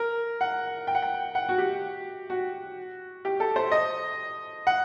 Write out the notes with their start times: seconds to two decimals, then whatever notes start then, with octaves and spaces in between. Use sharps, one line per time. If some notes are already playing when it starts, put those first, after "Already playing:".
Already playing: A#4
0.41 F#5
0.87 G5
0.95 F#5
1.02 G5
1.35 F#5
1.49 F#4
1.58 G4
2.30 F#4
3.25 G4
3.40 A4
3.56 C5
3.72 D#5
4.67 F#5